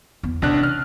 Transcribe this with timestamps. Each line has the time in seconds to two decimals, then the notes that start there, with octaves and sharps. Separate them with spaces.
0.23 E2
0.42 A1 C3 D4 F#6
0.63 F6